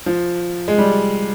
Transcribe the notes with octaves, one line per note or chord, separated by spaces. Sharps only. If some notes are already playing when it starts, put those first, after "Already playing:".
F3
G#3
G3